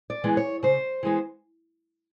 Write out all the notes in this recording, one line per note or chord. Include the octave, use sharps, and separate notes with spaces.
D5
E3 G#3 B3
C#5
C#3 C5
E3 G#3 B3